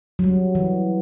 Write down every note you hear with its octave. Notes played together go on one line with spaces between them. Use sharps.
F#3
G3
E3